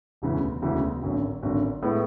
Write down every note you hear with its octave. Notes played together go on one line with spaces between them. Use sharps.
E1 D2 C#3 E3
E1 D2 C#3 E3
G#1 F#2 D3
G#1 F#2 D3
A2 G#3 B3 E4